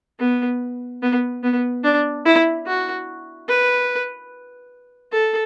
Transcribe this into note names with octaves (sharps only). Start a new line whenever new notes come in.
B3
B3
B3
D4
E4
F#4
B4
A4